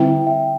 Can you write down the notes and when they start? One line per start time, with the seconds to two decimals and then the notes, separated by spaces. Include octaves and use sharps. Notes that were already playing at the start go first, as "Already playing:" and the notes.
Already playing: D3 G3 C4 E4 E5 G5
0.27 E5 G5